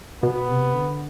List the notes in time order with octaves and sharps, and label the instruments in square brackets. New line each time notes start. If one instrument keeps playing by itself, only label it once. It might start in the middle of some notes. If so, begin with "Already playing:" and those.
[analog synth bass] B2 [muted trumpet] B3
[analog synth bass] C3
D3